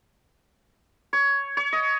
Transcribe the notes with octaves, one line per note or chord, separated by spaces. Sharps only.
C#5
C#5
D#5